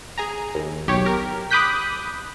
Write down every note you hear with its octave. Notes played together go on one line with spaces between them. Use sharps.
G#4 G#5 A#5
D#2
B1 G4 C#5
G4 A#4
B5 D6 D#6 F#6 G6 B6